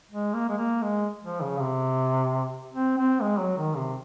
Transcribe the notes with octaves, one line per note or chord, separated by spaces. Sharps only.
G#3
A#3
G#3
A#3
G#3
F3
C#3
C3
C4
C4
G#3
F#3
D#3
C3